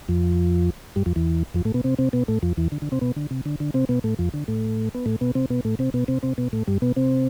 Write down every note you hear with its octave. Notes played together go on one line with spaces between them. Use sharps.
F2 F3
G2 G3
F2 F3
E2 E3
F2 F3
A2 A3
B2 B3
C3 C4
C3 C4
B2 B3
A2 A3
F2 F3
E2 E3
D3
D3
C3 C4
B2 B3
D3
C3
D3
D3
C3 C4
B2 B3
A2 A3
F2 F3
D3
A2 A3
B3
A2 A3
B2 B3
C3 C4
B2 B3
A2 A3
C3 C4
B2 B3
C3 C4
C3 C4
B2 B3
A2 A3
G2 G3
B2 B3
C3 C4